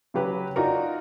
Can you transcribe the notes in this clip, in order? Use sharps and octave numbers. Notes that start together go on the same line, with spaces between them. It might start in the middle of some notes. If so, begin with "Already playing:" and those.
C#3 F#3 G4 B4
D#4 F4 F#4 A#4 D5